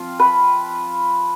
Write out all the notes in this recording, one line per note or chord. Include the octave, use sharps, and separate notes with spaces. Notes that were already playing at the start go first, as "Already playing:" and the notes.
Already playing: F3 C4 F4
B4